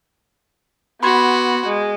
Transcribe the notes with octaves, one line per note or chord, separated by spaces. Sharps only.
B3 F#4 B5 C6 G#6
G#3